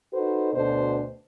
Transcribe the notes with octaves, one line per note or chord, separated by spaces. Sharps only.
D#4 F#4 A4 B4 C5
D2 B2 D4 A4 C5